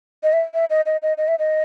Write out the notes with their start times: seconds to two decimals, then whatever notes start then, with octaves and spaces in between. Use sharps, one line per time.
0.23 D#5
0.33 E5
0.54 E5
0.70 D#5
0.86 D#5
1.02 D#5
1.18 D#5
1.28 E5
1.39 D#5